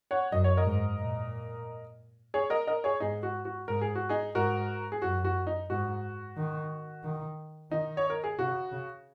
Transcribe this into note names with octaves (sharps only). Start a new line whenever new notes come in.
C#5 F#5
F#2 D#5
C#5
A#4 D#5
G#2
A#2
G#4 C#5
A#4 D#5
A#4 D#5
G#4 C#5
G#2 D#4 G#4
F#4
F#4
G#2 A#4
G#4
F#4
D#4 G#4
G#2 F#4 A#4
G#4
F#2 F#4
F#4
D#4
G#2 F#4
D#3
D#3
D#3 D#4
C#5
A#4
G#4
C#3 F#4
C#3